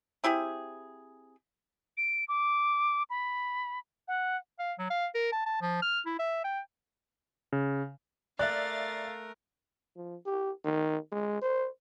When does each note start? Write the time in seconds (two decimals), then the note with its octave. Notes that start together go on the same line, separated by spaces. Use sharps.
0.24 C4 E4 G4 G#4
1.97 D7
2.28 D6
3.10 B5
4.08 F#5
4.59 F5
4.79 F#3
4.90 F5
5.15 A#4
5.32 A5
5.46 A5
5.62 F3
5.82 F6
6.06 E4
6.19 E5
6.44 G5
7.52 C#3
8.39 A3 A#4 D5 E5 F5 F#6 A6
9.96 F3
10.26 G4
10.64 D#3
11.12 G#3
11.42 C5